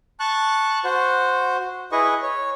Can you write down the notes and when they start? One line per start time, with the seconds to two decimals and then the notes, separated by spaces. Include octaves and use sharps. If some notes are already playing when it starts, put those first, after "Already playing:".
0.20 A5 C#6 F#6
0.84 F#4 C5
1.92 E4 G#4 B4 D#5 C#6
2.22 C#5